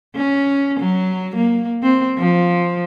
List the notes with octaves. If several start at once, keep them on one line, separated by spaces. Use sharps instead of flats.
C#4
F#3
A#3
C4
F3